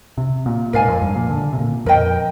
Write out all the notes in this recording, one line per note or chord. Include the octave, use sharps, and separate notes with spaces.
C3
A#2
G#2 A#4 D5 F5 G#5
F2
G2
A#2
D3
C3
A#2
F2 A#4 D#5 G5